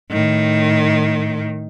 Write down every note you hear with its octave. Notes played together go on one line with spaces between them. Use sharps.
A2 D#3